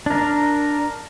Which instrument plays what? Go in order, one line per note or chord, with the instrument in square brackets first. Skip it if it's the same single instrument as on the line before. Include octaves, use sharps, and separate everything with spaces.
[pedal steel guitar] D4 A#4